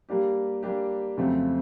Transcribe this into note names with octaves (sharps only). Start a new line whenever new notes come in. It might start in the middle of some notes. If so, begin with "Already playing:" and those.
G3 A#3 D4 G4
G3 A#3 D4 G4
F2 C#3 F#3 A3 C4